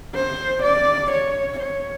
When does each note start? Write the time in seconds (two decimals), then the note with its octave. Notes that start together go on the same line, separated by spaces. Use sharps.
0.14 C5
0.63 D5
1.12 C#5
1.60 C#5